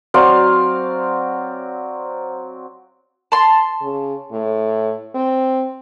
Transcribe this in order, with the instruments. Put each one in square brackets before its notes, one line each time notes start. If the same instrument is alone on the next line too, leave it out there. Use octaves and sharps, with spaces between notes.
[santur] F#3 C4 D5 F5
[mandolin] A5 C6
[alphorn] C#3
A2
C4